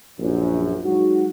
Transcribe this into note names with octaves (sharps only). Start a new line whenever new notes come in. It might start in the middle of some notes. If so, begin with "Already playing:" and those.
A#1 F#2
F#3 G#3 D#4 F#4